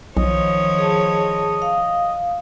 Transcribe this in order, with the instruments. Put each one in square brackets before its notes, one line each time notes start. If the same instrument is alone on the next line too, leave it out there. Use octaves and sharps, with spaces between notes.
[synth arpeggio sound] B1 [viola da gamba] D#3 F3 C#5 [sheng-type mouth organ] D#5
[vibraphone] G#4 A5
F5